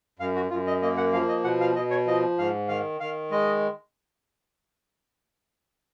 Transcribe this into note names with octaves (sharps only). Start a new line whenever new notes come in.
F#2 F5
F#4
F#2 F4
D#5
A#3 D#5
F#5
F3 F5
D#5
B2 F#5
F5
B2 D#5
C#5
F3 D#5
G#2 F5
D#3 F5
D#3 F5
G#3 D#5